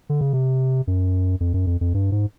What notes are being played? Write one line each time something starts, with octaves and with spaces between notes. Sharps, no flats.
D3
C#3
C3
F#2
F2
F#2
F2
F2
G2
G#2